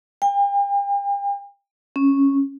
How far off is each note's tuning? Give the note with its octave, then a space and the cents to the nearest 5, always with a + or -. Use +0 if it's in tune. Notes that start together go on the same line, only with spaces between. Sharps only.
G5 +40
C#4 -5